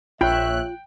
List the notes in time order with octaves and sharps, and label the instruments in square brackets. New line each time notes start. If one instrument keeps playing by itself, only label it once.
[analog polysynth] A#1 C#5 F#6 [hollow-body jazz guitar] F4 B5 [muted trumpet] E5 [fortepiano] G5